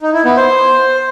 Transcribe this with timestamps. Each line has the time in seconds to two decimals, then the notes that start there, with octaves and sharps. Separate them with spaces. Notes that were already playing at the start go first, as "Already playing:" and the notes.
0.01 D#4
0.13 E4
0.25 B3
0.37 C5